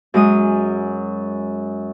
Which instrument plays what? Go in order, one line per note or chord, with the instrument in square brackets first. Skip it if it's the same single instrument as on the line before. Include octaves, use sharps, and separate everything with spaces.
[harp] F#2 G#3 D#6